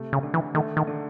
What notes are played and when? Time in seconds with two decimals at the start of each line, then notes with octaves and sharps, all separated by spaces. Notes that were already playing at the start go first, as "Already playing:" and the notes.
Already playing: C3 A3
0.13 C#3
0.23 D3
0.34 E3
0.55 D#3 A3
0.77 D#3
0.87 D3